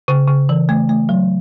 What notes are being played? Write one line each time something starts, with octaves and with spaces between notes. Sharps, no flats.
C#3
C#3
E3
A3
A3
F#3